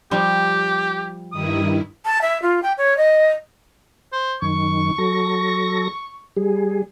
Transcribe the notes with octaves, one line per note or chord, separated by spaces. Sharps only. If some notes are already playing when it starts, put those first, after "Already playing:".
F3 G3 G4
G2 D#3 E4 D#6
A5
E5
F4
G5
C#5
D#5
C5
F#2 D#3 C#6
F#3 A4 A#6
G3 G#4